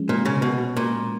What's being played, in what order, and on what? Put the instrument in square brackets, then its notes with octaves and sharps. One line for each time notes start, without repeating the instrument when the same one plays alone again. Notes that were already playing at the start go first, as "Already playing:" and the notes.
Already playing: [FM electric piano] F3 G#3 C#4
[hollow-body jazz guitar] A#2
C#3
B2
A#2